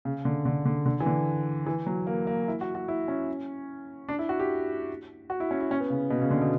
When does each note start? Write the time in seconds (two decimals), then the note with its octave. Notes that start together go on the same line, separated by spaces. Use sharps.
0.05 C#3
0.25 D3
0.45 D3
0.65 D3
0.86 D3
1.00 E3
1.06 D3
1.66 E3
1.86 F#3
2.07 A#3
2.27 A#3
2.48 E4
2.61 F#4
2.75 F#4
2.88 E4
3.08 C#4
4.09 D4
4.19 E4
4.29 F#4
4.40 G4
5.30 F#4
5.40 E4
5.51 C#4
5.60 E4
5.71 C#4
5.80 B3
5.90 C#3
6.10 B2
6.22 C#3
6.30 D3
6.41 B2